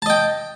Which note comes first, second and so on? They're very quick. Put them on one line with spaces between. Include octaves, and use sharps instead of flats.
A5 D#5 G5